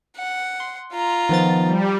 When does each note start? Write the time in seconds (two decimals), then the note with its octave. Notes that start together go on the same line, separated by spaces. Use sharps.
0.17 F#5
0.60 C6
0.92 F4 A#5
1.29 D#3 F3 B3 A6
1.66 G3